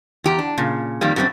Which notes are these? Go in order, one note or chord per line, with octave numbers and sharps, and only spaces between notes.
E2 G4 A#5
D4
A#2 C#3
F2 D#3 G3 A#3
F#2 G3 A3 A#3 C4 D4